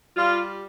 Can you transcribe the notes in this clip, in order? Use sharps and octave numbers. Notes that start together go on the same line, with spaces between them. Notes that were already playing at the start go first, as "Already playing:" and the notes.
G3 F4